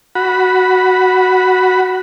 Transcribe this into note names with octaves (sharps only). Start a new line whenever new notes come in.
F#4 B5